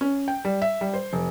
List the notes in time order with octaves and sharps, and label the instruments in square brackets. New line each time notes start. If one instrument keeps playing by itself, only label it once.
[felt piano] C#4
G5
G3
E5
G3
C5
F1